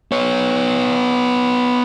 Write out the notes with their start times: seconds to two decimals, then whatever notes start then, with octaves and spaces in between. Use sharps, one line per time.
0.12 B3 C#5